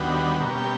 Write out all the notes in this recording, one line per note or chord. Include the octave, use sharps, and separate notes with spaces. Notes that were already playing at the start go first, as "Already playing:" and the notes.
Already playing: D#2 D3 G3 B3 F#4
B2 G3 A#3 C#4
G4